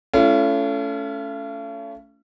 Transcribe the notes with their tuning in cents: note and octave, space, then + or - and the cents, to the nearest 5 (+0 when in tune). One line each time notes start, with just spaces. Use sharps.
A3 +0 C#4 +25 F4 -45